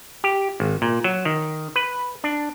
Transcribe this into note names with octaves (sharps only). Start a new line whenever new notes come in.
G4
G#1
A#2
F#3
D#3
B4
D4